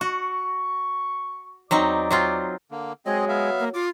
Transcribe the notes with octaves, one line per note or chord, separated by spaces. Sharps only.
F#4 C#6
E2 F#3 C4 D#4 D5 D6
F#3 C4 F4
D3 A#3
F#3 G#3 C4 G#4 D#5
B3 E5 F5
A#3
F4 D6